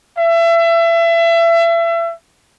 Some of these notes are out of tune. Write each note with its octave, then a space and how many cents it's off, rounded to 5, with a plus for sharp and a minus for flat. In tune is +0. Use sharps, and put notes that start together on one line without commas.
E5 +30